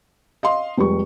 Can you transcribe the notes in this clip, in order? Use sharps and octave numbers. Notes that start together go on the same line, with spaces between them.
D#5 F5 C6
F1 G3 G#3 G4 C#6